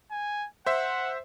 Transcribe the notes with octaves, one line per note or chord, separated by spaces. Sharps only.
G#5
C5 E5 F#5